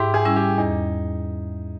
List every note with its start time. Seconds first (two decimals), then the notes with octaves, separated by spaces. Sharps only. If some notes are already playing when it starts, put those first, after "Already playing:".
Already playing: G#2 E4 G4
0.14 G#4
0.25 G3 C#4 E4
0.36 G4
0.58 E2 D#4